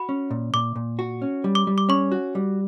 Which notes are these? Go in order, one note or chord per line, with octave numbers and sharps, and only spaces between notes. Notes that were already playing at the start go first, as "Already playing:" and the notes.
Already playing: F#4 B5
C#4
A#2
A#2 D6
A#2
F#4
C#4
G3
D6
G3
D6
C#4 C#6
F#4
G3